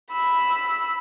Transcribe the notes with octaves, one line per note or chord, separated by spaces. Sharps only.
B5 E6